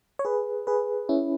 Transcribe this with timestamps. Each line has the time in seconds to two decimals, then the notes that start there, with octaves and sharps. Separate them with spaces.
0.19 C#5
0.25 G#4 B4
0.67 G#4 B4
1.09 C#4 E4